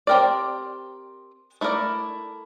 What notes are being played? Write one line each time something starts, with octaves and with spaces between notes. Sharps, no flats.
C4 G4 A#4 D5
A3 E4 A#4 D5